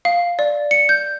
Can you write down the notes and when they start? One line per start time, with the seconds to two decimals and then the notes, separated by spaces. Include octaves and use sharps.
0.05 F5
0.39 D5
0.71 C#7
0.89 G6